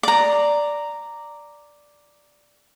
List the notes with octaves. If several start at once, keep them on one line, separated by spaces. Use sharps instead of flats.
D5 A#5